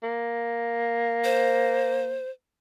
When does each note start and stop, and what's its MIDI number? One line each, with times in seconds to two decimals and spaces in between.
0.03 2.21 58
1.24 2.30 72